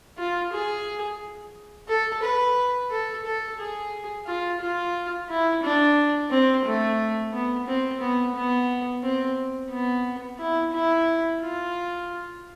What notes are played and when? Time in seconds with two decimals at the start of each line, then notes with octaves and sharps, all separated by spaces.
0.18 F4
0.53 G#4
1.89 A4
2.23 B4
2.91 A4
3.25 A4
3.59 G#4
4.27 F4
4.61 F4
5.29 E4
5.63 D4
6.31 C4
6.65 A3
7.33 B3
7.67 C4
8.01 B3
8.35 B3
9.03 C4
9.71 B3
10.39 E4
10.73 E4
11.41 F4